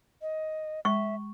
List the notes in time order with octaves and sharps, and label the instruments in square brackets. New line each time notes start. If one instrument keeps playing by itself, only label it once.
[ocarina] D#5
[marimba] G#3 [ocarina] E5 [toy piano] C#6